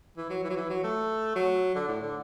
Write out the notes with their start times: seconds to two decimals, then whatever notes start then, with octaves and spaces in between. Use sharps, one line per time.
0.17 E3
0.30 F#3
0.44 E3
0.50 F#3
0.56 E3
0.70 F#3
0.84 A3
1.36 F#3
1.75 D3
1.88 A2
2.02 D3